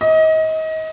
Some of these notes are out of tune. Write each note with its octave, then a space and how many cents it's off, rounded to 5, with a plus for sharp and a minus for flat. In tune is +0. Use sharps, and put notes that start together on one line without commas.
D#5 +30